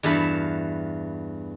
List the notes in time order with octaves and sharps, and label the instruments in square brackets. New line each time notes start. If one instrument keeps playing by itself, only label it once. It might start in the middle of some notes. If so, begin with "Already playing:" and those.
[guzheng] E2 G2 F#4 E5 A5 B5